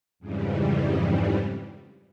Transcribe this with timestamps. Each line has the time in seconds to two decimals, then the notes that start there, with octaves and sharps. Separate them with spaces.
0.19 F2 G#2 C#3 E3 G3